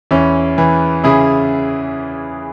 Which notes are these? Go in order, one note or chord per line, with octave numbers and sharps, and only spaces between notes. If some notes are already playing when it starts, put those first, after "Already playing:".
E2 C#4 E4
E3
C#3 E4 G#4